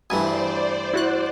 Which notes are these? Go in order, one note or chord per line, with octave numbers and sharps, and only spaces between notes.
D2 G2 E3 C5 D5 G#5
E4 F#4 F#6